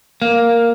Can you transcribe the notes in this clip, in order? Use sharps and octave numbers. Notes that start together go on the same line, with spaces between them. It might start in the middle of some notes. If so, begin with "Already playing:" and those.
A#3